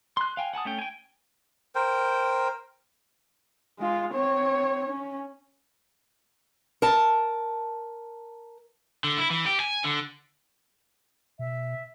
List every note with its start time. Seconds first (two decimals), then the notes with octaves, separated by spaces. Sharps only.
0.17 C6 F#6
0.37 F5 G5 G#5
0.54 F#5 G#5 A5 D#6
0.65 A3 C#4 G5
0.79 G5 G#5
1.75 A#4 C5 G5
3.79 G#3 F4
4.14 C4 C#5
4.89 C#4
6.82 A#4 A5
9.04 D3
9.18 E4
9.30 E3
9.46 G4
9.60 G#5
9.84 D3
11.39 B2 E5